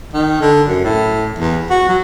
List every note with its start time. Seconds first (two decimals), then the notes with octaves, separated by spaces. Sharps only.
0.13 D#3
0.41 D3
0.67 F#2
0.84 A2
1.39 E2
1.70 F#4
1.88 F#3